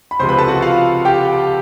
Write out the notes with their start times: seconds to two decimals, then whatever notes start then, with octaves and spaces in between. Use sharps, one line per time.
0.11 B5
0.20 C#2 C3 F3 G#3 C5 C6
0.29 B4 B5
0.39 A4 A5
0.48 F#4 F#5
0.62 F4 F5
1.05 G4 G5